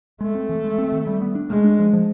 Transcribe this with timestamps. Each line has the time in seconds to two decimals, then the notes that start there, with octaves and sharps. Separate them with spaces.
0.21 G#3 A3
0.35 C4
0.49 E3
0.64 G#3
0.78 C4
0.92 D#3
1.07 G3
1.22 B3
1.35 D4
1.50 G#3 A3
1.64 D4
1.79 F3
1.93 F3